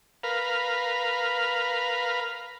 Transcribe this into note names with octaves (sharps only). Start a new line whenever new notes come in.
A#4 B4 F5